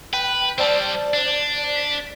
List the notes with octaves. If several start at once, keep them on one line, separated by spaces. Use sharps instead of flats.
B4 G5
G3 C4 C5 D5 A5
D4
B6